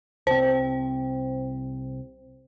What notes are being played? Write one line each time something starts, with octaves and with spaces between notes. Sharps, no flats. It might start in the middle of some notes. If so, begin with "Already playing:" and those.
C2 C4 C5